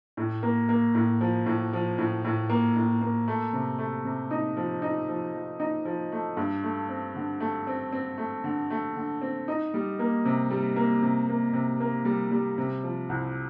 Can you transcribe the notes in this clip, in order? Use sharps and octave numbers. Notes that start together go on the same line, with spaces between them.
A2
A#3
A#3
A2
F3
A2
F3
A2
A2
A#3
A2
A#3
A3
C3
A3
C3
D#4
F3
D#4
F3
F3
D#4
F3
A3
G2
A3
C4
D3
A3
C4
C4
A3
D3
A3
D3
C4
D#4
G3
A#3
C3
G3
A#3
C3
A#3
C3
A#3
G3
G3
C3
F3
C2